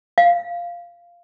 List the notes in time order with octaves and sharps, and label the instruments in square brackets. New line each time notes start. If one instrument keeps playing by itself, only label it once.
[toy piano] F5